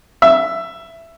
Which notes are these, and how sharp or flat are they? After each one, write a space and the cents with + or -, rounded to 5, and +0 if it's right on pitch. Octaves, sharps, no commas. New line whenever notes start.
E5 +10